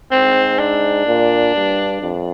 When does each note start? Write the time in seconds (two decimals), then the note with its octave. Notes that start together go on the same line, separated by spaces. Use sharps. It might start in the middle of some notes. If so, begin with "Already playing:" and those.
0.11 G#2 C4
0.59 D4
1.07 A#2
1.55 G2
2.02 F2